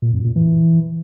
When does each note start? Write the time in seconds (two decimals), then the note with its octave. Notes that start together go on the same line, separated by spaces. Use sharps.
0.02 A#2
0.13 F#2
0.25 A#2
0.36 E3